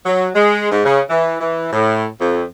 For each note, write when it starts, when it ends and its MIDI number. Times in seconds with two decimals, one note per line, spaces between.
0.05 0.27 54
0.35 0.70 56
0.71 0.82 44
0.85 1.01 49
1.10 1.36 52
1.40 1.68 52
1.72 2.06 45
2.21 2.43 41